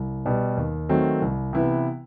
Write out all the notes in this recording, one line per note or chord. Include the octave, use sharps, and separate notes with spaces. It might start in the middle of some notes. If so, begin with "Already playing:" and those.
Already playing: C2
B2 G3
D#2
D#3 F#3 A3 C4
C2
C3 E3 B3 E4